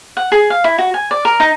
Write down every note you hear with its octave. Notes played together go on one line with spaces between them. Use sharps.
F#5
G#4
F5
E4
F#4
G#5
D5
A#4
D#4